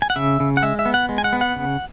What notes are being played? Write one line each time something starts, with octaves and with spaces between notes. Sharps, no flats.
G#5
F#5
C#3 E5
C#3
F#5
G#3 E5
E5
B3
F#5
G#3
G#5
F#5
B3
F#5
C#3